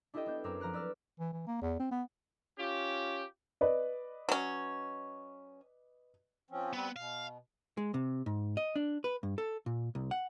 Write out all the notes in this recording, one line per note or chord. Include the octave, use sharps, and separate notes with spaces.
D4 E4 G4 A4 D#5 G5
B3 D4 G6
F#2 C4 A#4 D6 E6
F3 A#5 F6 F#6 D7
B4 D5 E6 F6
E3
E3
A#3
E2
C4
B3
C#4 F4 G4
B4 D5 D#5
F#3 C#4
F3 C4 C#4
G3 B3 C4
B2 F5
G#3
C3
G#2
D#5
D4
B4
G2
A4
A#2
C2
F#5